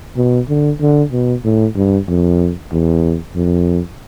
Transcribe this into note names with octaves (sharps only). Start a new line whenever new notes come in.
B2
D3
D3
B2
A2
G2
F2
E2
F2